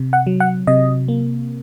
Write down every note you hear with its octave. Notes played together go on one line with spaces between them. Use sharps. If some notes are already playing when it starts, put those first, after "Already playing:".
Already playing: C3
F#5
F#3
F#5
C3 D#5
A#3